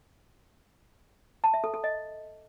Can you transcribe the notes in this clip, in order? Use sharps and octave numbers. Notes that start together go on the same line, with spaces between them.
A5
E5
A4
A4
D#5